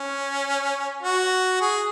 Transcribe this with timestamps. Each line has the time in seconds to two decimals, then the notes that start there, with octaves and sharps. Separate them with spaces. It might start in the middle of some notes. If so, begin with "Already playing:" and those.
Already playing: C#4
1.03 F#4
1.61 G#4